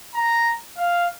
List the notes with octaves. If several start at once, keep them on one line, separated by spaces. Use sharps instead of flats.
A#5
F5